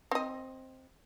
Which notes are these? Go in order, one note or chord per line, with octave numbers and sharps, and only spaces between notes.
C4 D#5